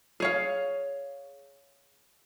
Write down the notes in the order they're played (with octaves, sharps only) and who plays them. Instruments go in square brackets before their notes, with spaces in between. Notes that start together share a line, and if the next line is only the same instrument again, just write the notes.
[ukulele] G#4 C#5 F5